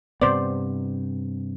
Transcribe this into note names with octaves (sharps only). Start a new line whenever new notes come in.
G2 C3 B3 C5 D5